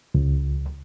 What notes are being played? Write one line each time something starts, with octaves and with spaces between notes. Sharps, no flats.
C#2